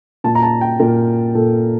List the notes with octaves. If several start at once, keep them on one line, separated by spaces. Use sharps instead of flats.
A#2 A5
A#5
A5
G5
A#2 A#4
A#2 A4